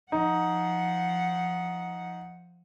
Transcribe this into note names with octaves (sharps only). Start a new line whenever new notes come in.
F3 D#4 F#5